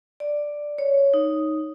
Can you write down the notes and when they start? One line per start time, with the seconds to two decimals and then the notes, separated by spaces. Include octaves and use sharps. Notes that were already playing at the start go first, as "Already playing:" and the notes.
0.20 D5
0.78 C#5
1.14 D#4